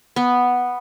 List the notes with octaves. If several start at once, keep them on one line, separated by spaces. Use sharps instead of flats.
B3